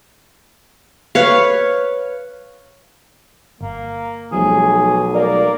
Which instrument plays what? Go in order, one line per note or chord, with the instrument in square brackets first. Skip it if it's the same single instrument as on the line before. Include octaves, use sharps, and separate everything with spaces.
[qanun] B4 C#5 F5
[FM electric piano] G1 [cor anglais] A#3
[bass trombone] B1 [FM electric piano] F3 G3 A3 [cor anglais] G#4
[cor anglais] A#3 [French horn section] A#4 D5